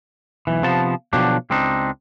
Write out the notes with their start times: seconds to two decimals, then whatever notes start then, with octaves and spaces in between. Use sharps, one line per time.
0.47 B1 E3
0.63 C3 F3 B3 A5
1.13 B2 D3 F3 F#3 D4 G4
1.50 C#2 C4 D4 D#4